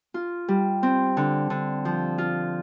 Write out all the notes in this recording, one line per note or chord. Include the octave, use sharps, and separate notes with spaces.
F4
G3
C4
D3
D3
F3
F4